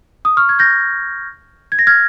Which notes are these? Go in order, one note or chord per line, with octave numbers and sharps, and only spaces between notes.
D#6
C#6 F6
G#6
G6 A#6
G#6
A#6
F6 G#6